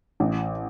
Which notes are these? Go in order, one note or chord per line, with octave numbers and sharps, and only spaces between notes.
A1